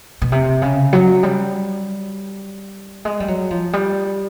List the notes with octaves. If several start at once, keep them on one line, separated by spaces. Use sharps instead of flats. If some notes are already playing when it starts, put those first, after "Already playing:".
B2
C3
C#3
F#3
G3
G#3
G3
F#3
F3
G3